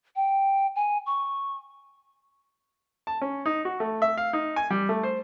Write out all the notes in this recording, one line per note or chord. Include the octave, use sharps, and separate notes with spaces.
G5
G#5
C#6
A5
C#4
D#4
F#4
A3
E5
F5
D#4
G#5
G3
A3
C5